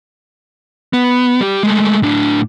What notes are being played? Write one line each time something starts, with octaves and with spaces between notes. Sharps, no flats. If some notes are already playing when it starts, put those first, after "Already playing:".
B3
G3 G4
G#3 A3
A2 D4